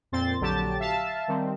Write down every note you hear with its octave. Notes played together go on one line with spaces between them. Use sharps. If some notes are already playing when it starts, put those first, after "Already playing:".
F2 A#2 C4 C6 A6
A#1 D3 F#3 G4 A5 A6
E5 F5 A5
D#3 G3 C4